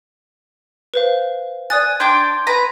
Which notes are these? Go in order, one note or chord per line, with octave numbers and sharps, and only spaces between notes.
B4 C5 F5
D5 G#5 D#6 F#6 A6
D4 G5 C6 D6 G6 G#6
B4 A#5